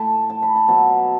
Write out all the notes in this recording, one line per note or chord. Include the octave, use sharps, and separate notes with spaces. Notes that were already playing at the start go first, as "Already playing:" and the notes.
Already playing: A2 G5 A5 B5
A5
B5
A5
B2 F#3 A5